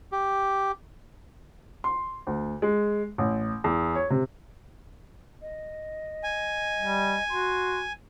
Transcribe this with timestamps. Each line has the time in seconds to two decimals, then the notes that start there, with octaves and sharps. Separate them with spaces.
0.12 G4
1.84 C6
2.27 D2
2.62 G#3
3.18 A1
3.64 E2
3.95 C#5
4.10 C3
5.42 D#5
6.24 G#5
6.79 G3
7.29 F#4 C6